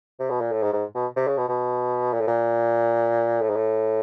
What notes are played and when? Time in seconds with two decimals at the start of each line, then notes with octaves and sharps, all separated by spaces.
0.19 C3
0.30 B2
0.41 A#2
0.52 A2
0.63 G#2
0.73 G#2
0.95 B2
1.16 C3
1.27 C#3
1.38 B2
1.48 B2
2.13 A#2
2.20 A2
2.27 A#2
3.42 A2
3.50 G#2
3.56 A2